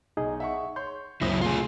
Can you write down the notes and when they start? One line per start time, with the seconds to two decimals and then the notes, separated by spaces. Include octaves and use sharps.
0.17 B1 D#4 G#4 D#5
0.40 E5 F#5 C#6
0.76 C#5 C6 G6
1.22 C#2 F#2 A#2 F#3 C4 E4 D#6 A#6
1.41 C3 A3 F4 G#4